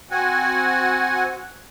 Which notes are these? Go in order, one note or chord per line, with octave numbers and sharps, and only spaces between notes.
C4 F#4 F#5 G#5